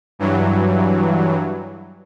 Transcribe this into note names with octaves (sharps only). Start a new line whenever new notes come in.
G2 E3 F#3